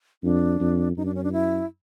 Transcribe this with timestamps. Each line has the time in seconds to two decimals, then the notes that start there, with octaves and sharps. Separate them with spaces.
0.23 F2 D4
0.60 F2
0.97 F#2 D#4
1.05 D4
1.15 C#4
1.24 D4
1.32 E4